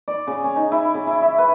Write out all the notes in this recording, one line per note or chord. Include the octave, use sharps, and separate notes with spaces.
D5
C#3
C#4
D#4
E4
C#3
E4
E5
B4